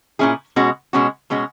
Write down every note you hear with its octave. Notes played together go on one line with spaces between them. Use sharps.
A#2 F#3 C#4 E4 G#4
B2 G#3 C#4 F#4
B2 G#3 C#4 F#4
B2 G#3 C#4 F#4